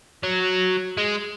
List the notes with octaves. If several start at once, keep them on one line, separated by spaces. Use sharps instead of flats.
F#3
G#3